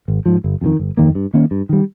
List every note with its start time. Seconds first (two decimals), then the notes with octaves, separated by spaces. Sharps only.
0.08 G#1
0.26 G#2 F3
0.44 G1
0.61 F2 C3 D#3
0.79 G1
0.97 F2 D#3 A#3
1.15 G2
1.34 D#3 A#3 C#4
1.51 G2
1.69 D#3 G3